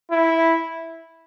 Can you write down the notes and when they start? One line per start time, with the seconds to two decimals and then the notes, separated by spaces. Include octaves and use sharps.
0.11 E4